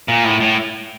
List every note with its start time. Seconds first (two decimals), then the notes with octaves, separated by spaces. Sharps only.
0.08 A#2
0.24 A2
0.40 A2